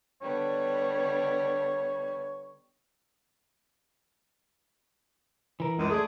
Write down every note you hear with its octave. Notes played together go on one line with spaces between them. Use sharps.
D3 G3 B3 C#5
E3 A#4
C#2 F#2 G#3
A3 G#4 D5